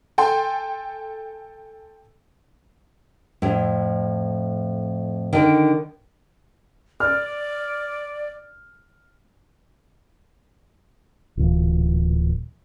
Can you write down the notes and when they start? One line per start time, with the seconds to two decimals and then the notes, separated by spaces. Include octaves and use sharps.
0.18 A4 G5 G#5 C6
3.42 F2 A2
5.33 D3 D#3
7.00 D5 F6
11.37 D1 A#2 E3